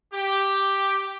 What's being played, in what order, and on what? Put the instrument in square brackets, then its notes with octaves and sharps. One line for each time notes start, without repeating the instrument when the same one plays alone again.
[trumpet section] G4